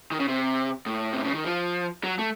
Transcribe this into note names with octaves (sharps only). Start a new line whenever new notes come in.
D#3
C#3
C3
A2
C3
C#3
D#3
F3
F#3
A3